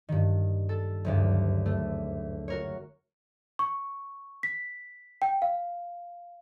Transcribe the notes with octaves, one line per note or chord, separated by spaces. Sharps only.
G2 D#3
A4
F#1 D2 G2
A3
F#4 A#4 C#5
C#6
B6
G5
F5